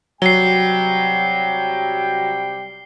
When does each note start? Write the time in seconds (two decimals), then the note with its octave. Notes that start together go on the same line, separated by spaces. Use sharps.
0.22 C3 F#3 G3 G5 C7 G7